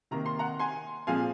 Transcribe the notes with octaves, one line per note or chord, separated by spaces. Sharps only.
C3 D#3 A#3 A#5
C6
F#5 A#5
G#5 C6
A#2 F3 G#3 C4 F5 G#5